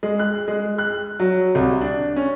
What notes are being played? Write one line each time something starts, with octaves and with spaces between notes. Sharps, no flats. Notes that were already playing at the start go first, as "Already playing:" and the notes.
G#3
F#6
G#3
F#6
F#3
C2
D4
C#4